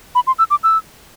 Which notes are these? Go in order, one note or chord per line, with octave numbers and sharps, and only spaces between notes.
B5
C6
E6
D6
E6